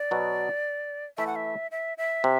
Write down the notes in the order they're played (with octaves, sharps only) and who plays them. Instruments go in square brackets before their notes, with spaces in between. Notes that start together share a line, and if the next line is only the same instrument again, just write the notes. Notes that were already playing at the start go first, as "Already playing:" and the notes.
Already playing: [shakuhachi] D5
[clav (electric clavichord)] B2 F#3 B3
[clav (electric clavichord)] E3 A3 E4 [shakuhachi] E5
[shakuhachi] F#5
E5
E5
E5
[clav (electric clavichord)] C3